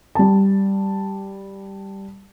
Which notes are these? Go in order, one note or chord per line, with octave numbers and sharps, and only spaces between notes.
G3 A5